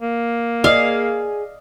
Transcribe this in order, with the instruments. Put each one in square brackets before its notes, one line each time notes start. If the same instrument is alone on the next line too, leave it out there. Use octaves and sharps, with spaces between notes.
[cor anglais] A#3
[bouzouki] G#4 [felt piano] D5 D#5 [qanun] F5